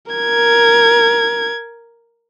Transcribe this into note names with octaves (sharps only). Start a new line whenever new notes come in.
A#4 G#6